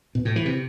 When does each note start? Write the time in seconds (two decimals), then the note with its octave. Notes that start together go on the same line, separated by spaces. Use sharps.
0.15 B2
0.25 A2
0.36 E3
0.46 C3